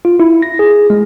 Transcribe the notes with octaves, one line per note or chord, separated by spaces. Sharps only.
F4
E4
A#6
G#4
G#3